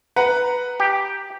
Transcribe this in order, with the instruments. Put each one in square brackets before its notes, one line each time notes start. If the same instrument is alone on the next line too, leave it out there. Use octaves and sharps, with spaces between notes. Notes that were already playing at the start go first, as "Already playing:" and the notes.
[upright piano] B4 F#5 A#5
[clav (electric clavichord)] G4